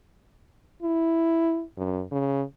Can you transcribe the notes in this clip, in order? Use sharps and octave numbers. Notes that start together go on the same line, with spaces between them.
E4
F#2
C#3